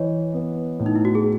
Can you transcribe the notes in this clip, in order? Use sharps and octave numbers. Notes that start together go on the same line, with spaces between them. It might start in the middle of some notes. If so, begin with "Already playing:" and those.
Already playing: E3 C#5 D#5
B3
A2
D#4
E4
F#4
G#4